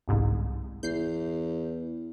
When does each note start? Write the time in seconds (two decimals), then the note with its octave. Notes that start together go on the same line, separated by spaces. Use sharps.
0.08 G1 C2 G#2
0.83 E2 G6 C7